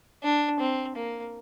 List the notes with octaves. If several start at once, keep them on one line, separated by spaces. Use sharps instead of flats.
D4
C4
A#3